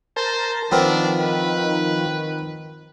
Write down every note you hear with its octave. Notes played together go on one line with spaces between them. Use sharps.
A#4 C5 A5
D#3 F3 B3 C4 D4 A#4
B4